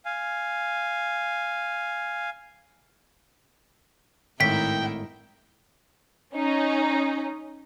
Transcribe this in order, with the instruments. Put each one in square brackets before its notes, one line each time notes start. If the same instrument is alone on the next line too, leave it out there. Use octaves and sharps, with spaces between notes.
[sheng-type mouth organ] F5 G#5
[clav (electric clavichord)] G#1 A2 [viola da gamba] D#4 E4 A#4 [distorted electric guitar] G5 [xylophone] B6
[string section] C#4 D#4